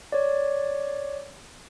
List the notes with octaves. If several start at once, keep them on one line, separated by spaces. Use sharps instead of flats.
C#5 D5